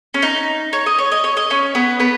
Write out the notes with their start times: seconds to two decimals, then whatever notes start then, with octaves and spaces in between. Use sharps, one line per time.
0.14 C#4
0.22 D#4
0.73 C#5
0.86 D#5
0.98 C#5
1.12 D#5
1.24 C#5
1.37 D#5
1.50 C#4 C#5
1.75 B3 B4
2.00 B3 B4